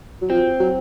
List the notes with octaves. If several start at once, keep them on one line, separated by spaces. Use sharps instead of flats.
F#3
F3 C4
F#3